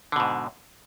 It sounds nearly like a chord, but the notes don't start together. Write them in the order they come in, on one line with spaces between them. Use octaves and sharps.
D3 B2 G#2